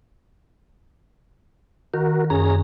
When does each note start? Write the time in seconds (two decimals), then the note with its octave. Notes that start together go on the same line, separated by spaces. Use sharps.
1.94 D#3 F#4 A#4
2.30 F#2 C#4 G#4 A#5